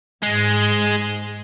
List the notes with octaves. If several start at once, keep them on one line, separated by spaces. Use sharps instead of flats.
G#2 G#3